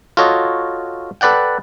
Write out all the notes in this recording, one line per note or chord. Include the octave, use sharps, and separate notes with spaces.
F4 F#4 A4 C#5 D#5 F5
A4 B4 D5 F#5 G5